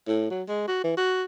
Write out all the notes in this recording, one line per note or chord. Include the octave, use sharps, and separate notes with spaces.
A2
F#3
G#3
F#4
E3
F#4